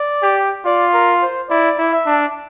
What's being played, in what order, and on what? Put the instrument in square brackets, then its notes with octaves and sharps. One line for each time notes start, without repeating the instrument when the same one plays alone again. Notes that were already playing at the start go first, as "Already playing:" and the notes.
Already playing: [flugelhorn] D5
[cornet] G4
[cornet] F4 [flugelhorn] D5
[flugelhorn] A#4
C5
[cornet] E4 [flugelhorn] D5
[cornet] E4
[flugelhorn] E5
[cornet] D4